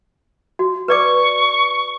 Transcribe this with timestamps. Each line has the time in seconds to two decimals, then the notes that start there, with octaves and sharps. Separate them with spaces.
0.59 F#4
0.88 B4 D5 C#6 D6